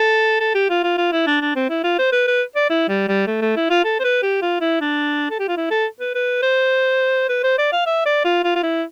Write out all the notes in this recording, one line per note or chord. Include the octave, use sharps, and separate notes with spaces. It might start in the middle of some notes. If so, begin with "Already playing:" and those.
Already playing: A4
A4
G4
F4
F4
F4
E4
D4
D4
C4
E4
F4
C5
B4
B4
D5
E4
G3
G3
A3
A3
E4
F4
A4
C5
B4
G4
F4
E4
D4
A4
G4
F4
E4
A4
B4
B4
C5
B4
C5
D5
F5
E5
D5
F4
F4
F4
E4